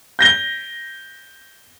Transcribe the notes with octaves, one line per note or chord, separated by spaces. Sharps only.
G6 A#6 G7